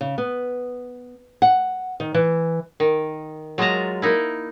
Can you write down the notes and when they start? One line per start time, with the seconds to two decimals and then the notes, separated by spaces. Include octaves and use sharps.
0.01 C#3
0.18 B3
1.42 F#5
2.00 D#3
2.14 E3
2.80 D#3
3.58 F#3 G#3 F4 D#5 A5 A#5
4.02 A#3 D#4 E4